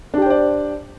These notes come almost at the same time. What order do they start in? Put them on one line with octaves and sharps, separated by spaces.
D4 G4 G5 C5 D5